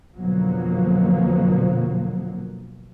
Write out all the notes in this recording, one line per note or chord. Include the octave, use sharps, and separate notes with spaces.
F2 B2 D3 F3 F#3 A#3